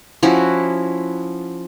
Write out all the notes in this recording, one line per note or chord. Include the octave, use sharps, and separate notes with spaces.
F3 C#4 E4 F#4